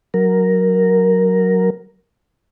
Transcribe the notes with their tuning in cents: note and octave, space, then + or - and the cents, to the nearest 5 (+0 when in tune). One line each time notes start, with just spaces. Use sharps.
F#3 +0 A#4 +0